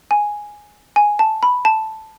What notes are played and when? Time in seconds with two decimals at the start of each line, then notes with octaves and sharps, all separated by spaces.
0.11 G#5
0.96 G#5
1.19 A5
1.43 B5
1.65 A5